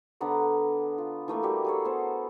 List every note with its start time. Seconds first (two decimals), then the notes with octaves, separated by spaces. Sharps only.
0.21 D3 B3 A#5 D6
0.98 F4
1.28 E3 A3 A#3 E4
1.43 G3 A#3 F#4 G4
1.65 G#4 A4 C#5
1.85 B3 C5